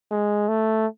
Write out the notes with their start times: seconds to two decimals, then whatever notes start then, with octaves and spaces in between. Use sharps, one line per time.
0.11 G#3
0.48 A3